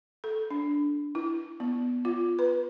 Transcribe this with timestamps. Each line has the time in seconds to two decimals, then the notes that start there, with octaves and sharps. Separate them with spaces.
0.24 A4
0.51 D4
1.15 E4
1.60 B3
2.05 F4
2.39 B4